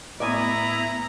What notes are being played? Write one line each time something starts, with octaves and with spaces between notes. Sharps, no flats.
A2 B3 E4 D5 G#5 A#5 D#6